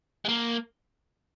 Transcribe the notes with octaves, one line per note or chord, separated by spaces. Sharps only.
G#3
A#3